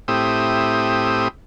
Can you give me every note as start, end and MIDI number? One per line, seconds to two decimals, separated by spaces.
0.08 1.28 45
0.08 1.28 60
0.08 1.28 64
0.08 1.28 67
0.08 1.28 87